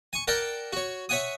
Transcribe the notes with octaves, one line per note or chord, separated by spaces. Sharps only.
G#5 C#6
A#4 D5 F#5 G5 A5
F#4 C#5
C#5 E5 F#5 G#5 D#6